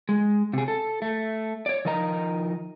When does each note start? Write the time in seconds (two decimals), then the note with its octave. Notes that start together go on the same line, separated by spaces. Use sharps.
0.09 G#3
0.53 C3 G#4
0.68 A4
1.02 A3
1.66 C#5 D5
1.85 D#3 F3 A#4 D#5 A#5